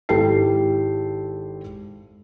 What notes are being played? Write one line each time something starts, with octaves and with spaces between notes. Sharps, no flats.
G#1 E4 G4 A4 G5 C7